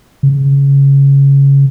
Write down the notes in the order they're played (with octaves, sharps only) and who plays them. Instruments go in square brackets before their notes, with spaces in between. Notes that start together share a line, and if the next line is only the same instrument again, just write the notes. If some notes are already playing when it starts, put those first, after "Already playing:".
[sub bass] C#3